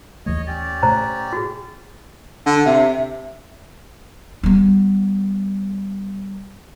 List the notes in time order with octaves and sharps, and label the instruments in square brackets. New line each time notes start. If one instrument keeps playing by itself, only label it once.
[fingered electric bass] D#2 E3 A3 [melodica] C#5 D#5
[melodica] C#4 G4 D5
[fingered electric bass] A2 C3 A3 [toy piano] C5 A#5
[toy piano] F#4 G#4
[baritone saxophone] D3
[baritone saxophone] C3 [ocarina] E5
[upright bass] G3 B3